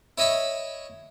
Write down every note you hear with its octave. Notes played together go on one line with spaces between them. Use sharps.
E4 C#5 D#5 E5 B5 C#6